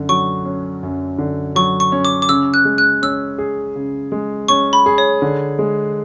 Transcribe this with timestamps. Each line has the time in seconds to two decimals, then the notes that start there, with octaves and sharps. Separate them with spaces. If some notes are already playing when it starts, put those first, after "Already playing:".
Already playing: F#2 D3
0.09 F#3 C#6
0.46 C#4
0.83 F#2
1.18 D3
1.56 F#3 C#6
1.80 C#6
1.92 C#4
2.05 D6
2.22 D6
2.29 C#3 E6
2.54 F#6
2.65 G#3
2.78 F#6
3.02 C#4 E6
3.38 G#4
3.76 C#3
4.12 G#3
4.48 C#4 C#6
4.73 B5
4.86 G#4
4.98 C#5
5.22 D3
5.59 G#3